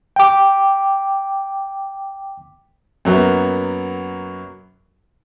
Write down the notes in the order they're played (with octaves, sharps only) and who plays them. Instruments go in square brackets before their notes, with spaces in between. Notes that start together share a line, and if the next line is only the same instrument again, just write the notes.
[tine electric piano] G5 D6
[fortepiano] F#2 F#3 A#3 B3